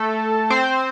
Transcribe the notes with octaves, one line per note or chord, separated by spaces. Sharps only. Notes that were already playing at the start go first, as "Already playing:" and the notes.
Already playing: A3 A4
C4 C5